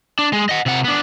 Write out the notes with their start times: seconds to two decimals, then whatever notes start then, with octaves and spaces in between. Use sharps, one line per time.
0.19 D4
0.33 G#3
0.49 D#5 F#5
0.66 C3 F#5
0.84 B3 D4